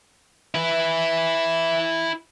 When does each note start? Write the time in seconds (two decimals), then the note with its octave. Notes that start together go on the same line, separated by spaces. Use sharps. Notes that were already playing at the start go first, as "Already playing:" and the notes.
0.55 E4 B4